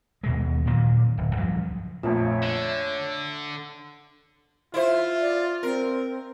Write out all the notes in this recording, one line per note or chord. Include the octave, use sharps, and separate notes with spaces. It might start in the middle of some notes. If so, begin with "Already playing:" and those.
D#2 B2 G#3
A#2 D#3 F#3
D1
C#2 G2 F3 F#3
A#1 F2 A#2 A3 F4 C#5 E5
D3 E7
E4 F4 C5
D5
C4 A#4